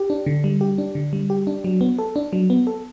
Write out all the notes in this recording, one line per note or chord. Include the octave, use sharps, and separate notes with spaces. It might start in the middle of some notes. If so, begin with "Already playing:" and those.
Already playing: G4
D4
D3
G3
G4
D4
D3
G3
G4
D4
F#3
B3
A4
D4
F#3
B3
A4